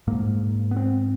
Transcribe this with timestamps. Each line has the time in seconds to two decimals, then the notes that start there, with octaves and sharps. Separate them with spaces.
0.07 G#2 A#3
0.71 B3
0.76 C4